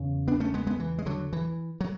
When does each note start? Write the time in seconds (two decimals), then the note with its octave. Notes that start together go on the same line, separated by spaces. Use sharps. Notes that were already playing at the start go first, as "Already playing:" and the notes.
Already playing: E2 C#3
0.28 B3 D4
0.40 A3 C#4
0.54 G#3 B3
0.67 G#3 B3
0.80 E3
0.98 G#3
1.06 D3 F#3
1.33 E3
1.81 F#3